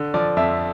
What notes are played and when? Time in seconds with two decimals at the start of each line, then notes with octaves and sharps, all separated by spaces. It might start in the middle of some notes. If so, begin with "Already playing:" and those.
Already playing: D3
0.14 F3 D5
0.37 F2 E5